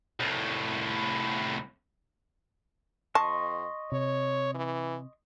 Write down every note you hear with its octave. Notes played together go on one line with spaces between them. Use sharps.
C2 A2
F2 D#5 A5 C6 C#6
C3 C#5
E3